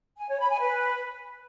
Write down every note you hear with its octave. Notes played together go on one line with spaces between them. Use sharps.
G#5
C#5
B5
G#5
B4